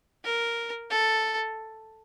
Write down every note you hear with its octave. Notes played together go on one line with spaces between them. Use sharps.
A#4
A4